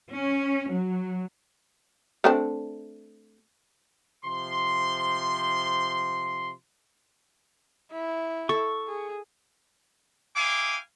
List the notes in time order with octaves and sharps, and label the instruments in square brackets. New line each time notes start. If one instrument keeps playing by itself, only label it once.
[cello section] C#4
F#3
[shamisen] A3 C4 D4
[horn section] C3 F3 C6
[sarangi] E4
[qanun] A4 [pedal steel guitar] C#6
[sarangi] G#4
[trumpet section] E4 G#4 F5 G5 G#5 D6